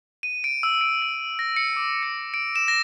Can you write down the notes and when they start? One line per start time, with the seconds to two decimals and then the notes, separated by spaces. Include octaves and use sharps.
0.23 D#7
0.44 D7
0.63 E6
0.81 D7
1.02 D#7
1.39 A#6
1.57 C#7
1.76 D6
2.03 C#7
2.34 D7
2.56 E7
2.68 A#6